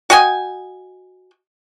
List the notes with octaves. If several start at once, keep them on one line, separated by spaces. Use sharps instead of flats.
F#4 D#5 G5 G#5